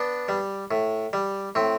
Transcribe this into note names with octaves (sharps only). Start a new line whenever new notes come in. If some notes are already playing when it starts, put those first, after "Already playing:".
Already playing: B3 D4
G3
A2
G3
A2 C4